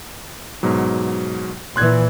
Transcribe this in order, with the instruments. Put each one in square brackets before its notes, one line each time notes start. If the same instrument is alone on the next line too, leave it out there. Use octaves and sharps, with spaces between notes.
[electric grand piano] G#2 B2 F#3
[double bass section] A#2 E3 [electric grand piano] C6 F#6 G#6